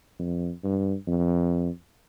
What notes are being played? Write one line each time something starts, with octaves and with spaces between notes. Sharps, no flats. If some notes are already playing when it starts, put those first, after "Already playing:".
F2
G2
F2